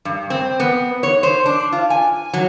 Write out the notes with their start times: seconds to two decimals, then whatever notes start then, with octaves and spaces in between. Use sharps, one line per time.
0.05 G2
0.30 C4
0.60 B3
1.03 C#5
1.23 C5
1.46 D4
1.72 F4
1.90 G#5
2.33 F#3